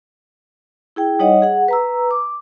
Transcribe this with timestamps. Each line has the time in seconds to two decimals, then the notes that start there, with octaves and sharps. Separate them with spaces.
0.96 E4 G#4 G5
1.19 G3 D#4 C#5 D#5 F#5
1.42 G#4 F#5
1.68 B4 A#5 E6
2.11 D6